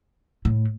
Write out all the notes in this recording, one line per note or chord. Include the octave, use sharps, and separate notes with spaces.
A2